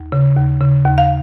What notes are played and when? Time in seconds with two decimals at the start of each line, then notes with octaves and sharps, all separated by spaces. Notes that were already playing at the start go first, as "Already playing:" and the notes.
Already playing: D#2
0.12 C#3
0.36 D#2
0.61 C#3
0.85 D#2
0.98 F5